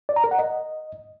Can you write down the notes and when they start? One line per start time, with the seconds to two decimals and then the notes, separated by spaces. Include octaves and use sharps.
0.09 D5
0.16 A#5
0.24 A#4
0.31 F#5
0.39 D#5